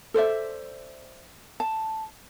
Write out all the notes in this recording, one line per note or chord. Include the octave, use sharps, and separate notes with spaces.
A4 C5 D5 E5
A5